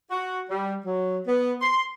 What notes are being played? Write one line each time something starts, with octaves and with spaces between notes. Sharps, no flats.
F#4
G3
F#3
B3
C6